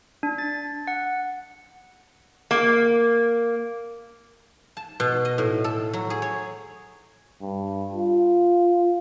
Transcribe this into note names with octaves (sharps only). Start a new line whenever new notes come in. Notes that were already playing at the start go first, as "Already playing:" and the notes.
D4
A6
F#5
A#3
A5
B2
D#5
A2
A4
F#3
G#4
C#5
G2
F4